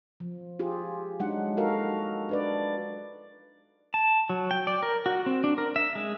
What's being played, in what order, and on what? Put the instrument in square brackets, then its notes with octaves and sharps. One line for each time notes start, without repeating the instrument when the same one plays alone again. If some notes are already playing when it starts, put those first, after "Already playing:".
[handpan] F3
F4 G4 G#4
F#3 G#3 D4 D#4 F#5
D#4 F#4 A4 A#4 F5
D4 B4 D5
[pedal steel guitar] A5
F#3
G5
D5
A#4
F#4
C4
D4
A#4
E5
G#3